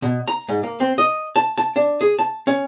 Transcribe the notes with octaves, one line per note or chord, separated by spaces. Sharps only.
B2
A#5
G#2
A#3
C4
D#5
A5
A5
D4
G#4
A5
C#4